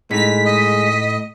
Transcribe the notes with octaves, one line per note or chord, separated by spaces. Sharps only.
A2 G#3 D#4 B6
D#5